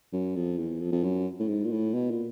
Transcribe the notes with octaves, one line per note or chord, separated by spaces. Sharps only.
F#2
F2
E2
F2
F2
F#2
A2
G#2
A#2
A2
B2
A#2